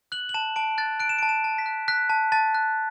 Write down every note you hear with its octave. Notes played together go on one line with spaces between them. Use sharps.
F#6 F#7
F#7
A5 E7
A5 D7
F#6 A6
F#6 D7
E7
D7
A5
E7
A5
B6
F#6
F#6 B6
A5
A5 A6
F#6